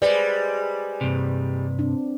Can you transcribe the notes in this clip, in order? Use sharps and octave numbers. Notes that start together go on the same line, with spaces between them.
G3 G#3 B4 C5 D5
G2 C3
C4 D4